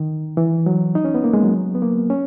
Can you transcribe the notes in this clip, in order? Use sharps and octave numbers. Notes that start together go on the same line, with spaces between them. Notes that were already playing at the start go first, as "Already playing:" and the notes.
Already playing: D#3
E3
F#3
D#4
C#4
B3
A#3
G#3
F#3
B3
A#3
C#4